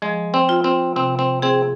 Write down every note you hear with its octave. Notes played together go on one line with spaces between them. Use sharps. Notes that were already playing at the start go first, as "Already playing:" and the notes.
F3 G#3
C4
F4
C4
C3 C4
C4
C4 G#4